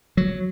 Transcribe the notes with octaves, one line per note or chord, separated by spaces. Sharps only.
F#3